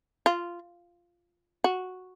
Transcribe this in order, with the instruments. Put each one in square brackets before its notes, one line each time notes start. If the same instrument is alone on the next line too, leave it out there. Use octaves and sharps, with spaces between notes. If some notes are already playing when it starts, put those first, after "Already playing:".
[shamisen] F4
F#4